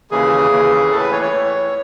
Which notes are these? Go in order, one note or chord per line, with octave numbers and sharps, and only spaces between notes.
D#2 C#3 E3 G#4
D#2 C#3 E3
A2 E3 A4
B4
C#5
C#5
A2 E3